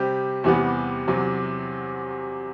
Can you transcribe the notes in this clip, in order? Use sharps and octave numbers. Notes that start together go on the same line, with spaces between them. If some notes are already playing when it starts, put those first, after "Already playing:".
Already playing: C3 G3 C4 G4
E2 C3 E3 G3 B3
E2 C3 F#3